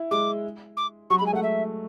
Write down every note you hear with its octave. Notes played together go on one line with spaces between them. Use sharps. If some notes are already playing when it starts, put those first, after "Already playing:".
Already playing: E4
G#3 D6
D6
F#3 C#6
B5
G#3
G#5
A3 F#5
E5